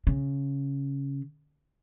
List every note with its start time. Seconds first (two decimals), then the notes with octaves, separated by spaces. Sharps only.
0.07 C#3